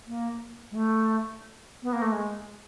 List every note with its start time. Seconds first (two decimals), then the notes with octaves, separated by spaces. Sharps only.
0.07 A#3
0.72 G#3
0.75 A3
1.83 B3
1.93 A#3
2.02 A3
2.12 G#3